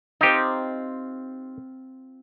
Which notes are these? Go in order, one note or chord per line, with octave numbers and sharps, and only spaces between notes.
C4 D#4 F4 G4